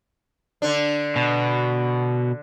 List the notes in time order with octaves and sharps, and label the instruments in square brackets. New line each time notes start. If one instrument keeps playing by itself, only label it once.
[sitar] D3 D4
[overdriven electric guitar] B2